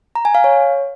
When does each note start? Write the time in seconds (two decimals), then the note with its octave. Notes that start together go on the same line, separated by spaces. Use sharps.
0.15 A#5
0.25 G#5
0.35 F5
0.44 C#5